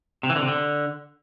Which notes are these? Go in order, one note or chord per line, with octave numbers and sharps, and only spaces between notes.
C3
E3
D3
C3
D3